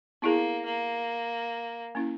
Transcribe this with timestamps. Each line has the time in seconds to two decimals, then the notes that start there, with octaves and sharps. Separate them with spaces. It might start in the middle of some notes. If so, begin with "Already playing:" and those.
0.22 A#3 B3 E4 G#4
0.65 A#3
1.95 A#3 C#4 E4